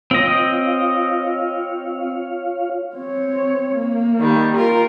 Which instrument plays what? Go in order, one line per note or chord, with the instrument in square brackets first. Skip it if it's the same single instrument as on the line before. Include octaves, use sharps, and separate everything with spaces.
[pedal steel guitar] C4 D#5 [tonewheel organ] F4 C#5 F5
[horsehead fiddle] C4 C#5
A#3
[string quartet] D#3 G3
F4 A#4